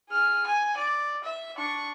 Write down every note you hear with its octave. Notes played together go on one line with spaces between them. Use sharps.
G#4 F6
G#5
D5
E5
D4 C#6